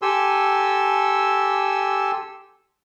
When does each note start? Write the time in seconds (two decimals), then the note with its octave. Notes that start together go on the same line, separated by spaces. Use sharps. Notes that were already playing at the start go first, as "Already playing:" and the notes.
0.02 G4 A4 G#5 C6 E6